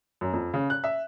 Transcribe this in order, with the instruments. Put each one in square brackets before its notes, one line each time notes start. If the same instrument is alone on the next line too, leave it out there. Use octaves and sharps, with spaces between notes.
[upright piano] F#2
F2
C#3
F#6
E5